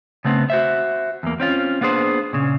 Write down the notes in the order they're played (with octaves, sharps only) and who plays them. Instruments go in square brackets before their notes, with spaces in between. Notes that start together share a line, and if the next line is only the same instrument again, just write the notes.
[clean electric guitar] C#3 A3 B3 C4
F#4 C5 E5
E2 A#3
C4 C#4 F4
A#3 B3 D4 G#4 C5
A#2 C#3